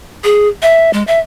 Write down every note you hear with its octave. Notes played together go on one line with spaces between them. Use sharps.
G#4
E5
G#3
E5